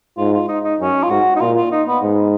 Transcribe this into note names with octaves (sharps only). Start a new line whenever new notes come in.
G#2 F4
F4
D#4
D#4
F#2 C#4
F4
G#2 F#4
D#4
A#2 F4
F4
D#4
B3
G#2